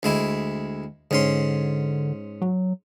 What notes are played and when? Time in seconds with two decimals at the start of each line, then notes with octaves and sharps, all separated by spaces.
0.03 D2 G#3 E4
1.11 G#2 D3 C#4 C6
2.42 F#3